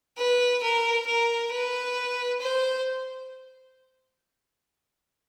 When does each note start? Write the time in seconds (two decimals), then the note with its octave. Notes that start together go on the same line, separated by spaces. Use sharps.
0.18 B4
0.63 A#4
1.07 A#4
1.52 B4
2.41 C5